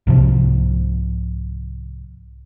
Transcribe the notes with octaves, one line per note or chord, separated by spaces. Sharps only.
C2 G#2 C3 F3